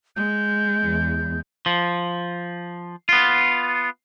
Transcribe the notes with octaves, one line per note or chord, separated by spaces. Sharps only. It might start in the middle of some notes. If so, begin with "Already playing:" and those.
G#3 G6
E2
F3
B3 F4